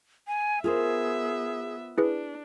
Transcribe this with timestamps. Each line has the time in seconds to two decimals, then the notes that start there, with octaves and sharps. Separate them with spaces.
0.27 G#5
0.64 B3 F4 G#4 A#4 C5 E5
1.98 D4 E4 G#4 B4